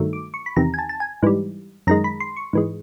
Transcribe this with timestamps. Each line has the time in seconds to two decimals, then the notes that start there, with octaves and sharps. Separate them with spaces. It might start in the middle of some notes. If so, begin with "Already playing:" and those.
Already playing: G2 D#3 F#3 A3
0.13 D6
0.34 C#6
0.46 B5
0.56 E2 C3 D#3 A#5
0.74 G#5
0.79 A5
0.89 A5
1.00 G#5
1.23 G#2 E3 G3
1.87 F#2 D#3 G#3 A#5
2.04 B5
2.20 C6
2.36 C#6
2.53 G#2 E3 G#3